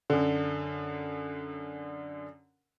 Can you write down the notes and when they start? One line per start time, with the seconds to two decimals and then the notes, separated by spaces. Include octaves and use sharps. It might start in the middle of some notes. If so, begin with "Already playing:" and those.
0.10 F#2 D3